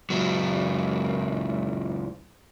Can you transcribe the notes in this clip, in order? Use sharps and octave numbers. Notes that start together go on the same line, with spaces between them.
C#2 F#3